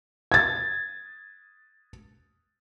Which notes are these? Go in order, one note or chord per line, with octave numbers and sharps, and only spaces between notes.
G#6 A6